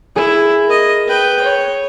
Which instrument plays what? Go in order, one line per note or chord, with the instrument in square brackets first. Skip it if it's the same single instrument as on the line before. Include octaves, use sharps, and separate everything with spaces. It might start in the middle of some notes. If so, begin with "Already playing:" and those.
[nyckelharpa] E4 [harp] G#4
[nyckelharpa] A#4 D#5
B4 G5
C#5